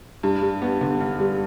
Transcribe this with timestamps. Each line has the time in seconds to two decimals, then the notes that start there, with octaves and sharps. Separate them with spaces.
0.23 G2
0.42 G3
0.62 B3
0.81 D3
1.00 G2
1.20 G3